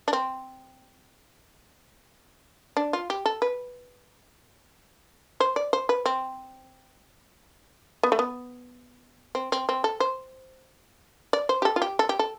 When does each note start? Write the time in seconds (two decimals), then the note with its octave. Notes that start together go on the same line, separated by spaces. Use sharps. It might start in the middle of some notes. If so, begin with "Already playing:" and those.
0.08 D4
0.13 C4
2.77 D4
2.93 F4
3.10 G4
3.25 A4
3.42 B4
5.40 C5
5.56 D5
5.73 C5
5.89 B4
6.06 C4
8.03 B3
8.12 A3
8.19 B3
9.35 C4
9.52 C4
9.69 C4
9.84 A4
10.00 C5
11.33 D5
11.49 C5
11.62 G4
11.65 A4
11.76 F4
11.82 G4
11.99 A4
12.09 G4
12.19 A4